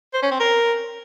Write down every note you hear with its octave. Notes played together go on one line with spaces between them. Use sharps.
C5
C#4
C4
A#4